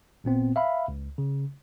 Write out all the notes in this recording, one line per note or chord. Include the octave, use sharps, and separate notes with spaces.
G#1 A#2 B3 C4
E5 F5 B5
C#2
C#3